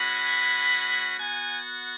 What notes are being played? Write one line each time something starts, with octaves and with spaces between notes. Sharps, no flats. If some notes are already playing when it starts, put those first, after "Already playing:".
Already playing: G#3 C#4 F#4 B5
B3 F#4 G#5